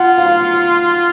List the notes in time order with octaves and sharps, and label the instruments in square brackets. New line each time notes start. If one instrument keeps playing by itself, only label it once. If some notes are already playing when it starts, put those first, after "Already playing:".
Already playing: [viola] F4 [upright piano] F#5
[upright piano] F5